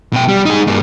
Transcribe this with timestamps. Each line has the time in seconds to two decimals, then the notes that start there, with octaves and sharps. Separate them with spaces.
0.13 B2 G5
0.28 G3
0.46 D#4 G#4
0.67 G2 A#3